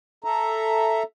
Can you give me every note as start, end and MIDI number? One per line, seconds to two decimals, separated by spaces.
0.24 1.03 69
0.24 1.03 76
0.24 1.03 82